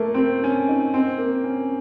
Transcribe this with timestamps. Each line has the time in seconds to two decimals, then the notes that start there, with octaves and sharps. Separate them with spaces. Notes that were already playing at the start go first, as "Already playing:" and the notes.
Already playing: A3 A#3
0.14 C4
0.18 A#3
0.44 C#4
0.69 D#4
0.94 C4
1.18 A#3
1.44 C#4